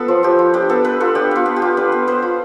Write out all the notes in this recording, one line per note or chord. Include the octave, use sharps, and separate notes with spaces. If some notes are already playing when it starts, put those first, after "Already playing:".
Already playing: B3 F4 A4 B4
F3
F3 G4
F4
D4 G4
B3 A4
B3 B4
F4 A4
D4 G4
B3 F4
B3
G4
F4
D4 B4
B3
B3 C5
F4